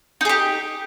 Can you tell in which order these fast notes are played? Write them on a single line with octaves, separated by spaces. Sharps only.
D#4 G#4 G4